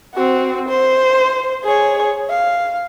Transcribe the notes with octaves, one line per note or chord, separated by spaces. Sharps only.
C4 F#4
C5
G#4 C#5
F5